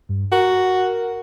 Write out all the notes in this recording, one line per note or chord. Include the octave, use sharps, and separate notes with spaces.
G2
F#4 A#4